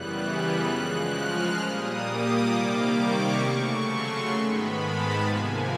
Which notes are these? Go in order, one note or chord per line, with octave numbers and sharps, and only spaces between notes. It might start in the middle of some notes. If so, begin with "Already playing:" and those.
Already playing: F#2 C#3 E3 G3 B3 F#6
F#6
C#3 F3 G#3 F#6
F6
A#2 G3 A#3 D#6
D6
C3 D#3 G3 A#3 D6
C#6
C#3 F#3 A3 C#6
C6
G#2 D#3 G#3 B3 B5
A5
C3 F3 A#3 G#5